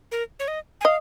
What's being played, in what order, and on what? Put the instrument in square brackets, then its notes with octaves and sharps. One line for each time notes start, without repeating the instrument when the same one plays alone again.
[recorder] A#4
C#5
D#5
G#5
[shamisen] D#5 [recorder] F5